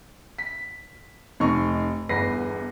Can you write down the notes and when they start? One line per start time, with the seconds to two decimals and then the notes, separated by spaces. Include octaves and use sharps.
0.38 B6
1.40 F1 D#4 C#6
2.09 G1 E2 B4 A#6 C7